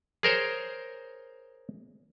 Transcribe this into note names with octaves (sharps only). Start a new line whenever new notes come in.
G#4 A#4 C5 C#5